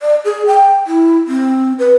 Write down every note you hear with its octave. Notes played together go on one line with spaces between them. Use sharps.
D5
G#4
G5
E4
C4
B4